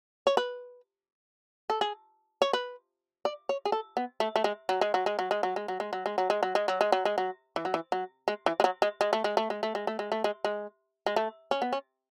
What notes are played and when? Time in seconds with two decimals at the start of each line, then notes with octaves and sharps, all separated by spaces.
0.27 C#5
0.37 B4
1.70 A4
1.81 G#4
2.42 C#5
2.53 B4
3.25 D5
3.49 C#5
3.65 G#4
3.72 A4
3.97 B3
4.20 A3
4.36 A3
4.44 G#3
4.69 F#3
4.81 G#3
4.94 F#3
5.06 G#3
5.19 F#3
5.31 G#3
5.43 F#3
5.56 G#3
5.68 F#3
5.80 G#3
5.93 F#3
6.06 G#3
6.18 F#3
6.30 G#3
6.43 F#3
6.55 G#3
6.68 F#3
6.81 G#3
6.92 F#3
7.05 G#3
7.18 F#3
7.56 E3
7.65 F#3
7.74 E3
7.92 F#3
8.28 G#3
8.46 E3
8.60 G#3
8.64 F#3
8.82 G#3
9.01 G#3
9.13 A3
9.24 G#3
9.37 A3
9.50 G#3
9.63 A3
9.75 G#3
9.87 A3
9.99 G#3
10.12 A3
10.24 G#3
10.45 G#3
11.06 G#3
11.16 A3
11.51 C#4
11.62 B3
11.73 C#4